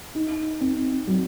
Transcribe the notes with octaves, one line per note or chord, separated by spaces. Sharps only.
D#4
C4
F#3